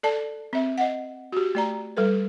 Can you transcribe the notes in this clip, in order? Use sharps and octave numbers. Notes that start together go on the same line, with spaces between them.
A4 D5 A5
C4 E5
D#5 F#5
F#4 G4
A3 D5 A#5
G3 A4 B4